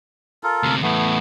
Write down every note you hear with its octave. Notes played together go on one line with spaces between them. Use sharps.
F4 A4 A#4
D2 C3
E2 A2 A3 B3